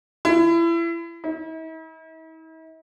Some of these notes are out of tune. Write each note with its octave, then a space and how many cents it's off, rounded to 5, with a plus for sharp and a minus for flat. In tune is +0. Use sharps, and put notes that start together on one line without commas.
E4 +30
E4 -45